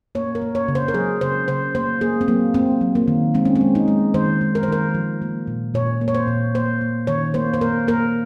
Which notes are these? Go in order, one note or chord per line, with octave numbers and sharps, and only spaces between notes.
A#3 C#5
A#4
A#3
C#5
C#3
C5
A#4
F#3 G#4
C#3 C5
C#3 C5
A#3 C5
A#3 G#4
C4
F#3 A#3
A#3 C4
F#3
A#3
D#3
G#3 C4
C#4
C4
G#3
D#4
G#3
D#3 C5
G#3
A#4
C5
D#3 A#4
F3
A#3
A#2
A#2 C#5
A#3
C#5
C5
A#2
A#3 C5
A#3
D#3 C#5
A#3 C5
C5
A#3 A#4
A#3 A#4